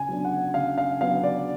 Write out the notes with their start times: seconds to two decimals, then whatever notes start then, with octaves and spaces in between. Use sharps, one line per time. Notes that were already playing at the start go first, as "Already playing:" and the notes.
Already playing: C#3 G#5
0.09 F#3 B3 D4
0.25 F#5
0.54 C#3 F5
0.78 F5
1.01 F#3 B3 D4 F5
1.24 D5